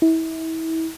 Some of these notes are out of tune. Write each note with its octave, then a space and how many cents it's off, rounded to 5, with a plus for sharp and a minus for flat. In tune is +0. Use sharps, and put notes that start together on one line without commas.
E4 -30